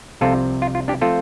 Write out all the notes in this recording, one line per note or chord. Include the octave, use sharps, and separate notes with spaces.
C2 C3 F3 C4 F4 A4
F4
F4
D4 G4
F3 A3 C4 F4 A4